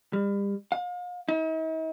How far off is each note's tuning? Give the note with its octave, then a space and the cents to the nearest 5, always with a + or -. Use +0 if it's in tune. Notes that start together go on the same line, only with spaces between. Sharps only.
G3 +35
F5 +40
D#4 +45